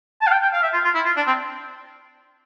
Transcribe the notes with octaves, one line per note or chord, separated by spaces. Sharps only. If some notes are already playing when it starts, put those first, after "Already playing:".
A5
F5
G5
G5
F5
E5
F4
F4
E4
F4
D4
C4